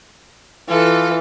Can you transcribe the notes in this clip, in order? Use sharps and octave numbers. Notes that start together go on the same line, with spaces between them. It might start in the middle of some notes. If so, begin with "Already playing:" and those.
E3 F4 A4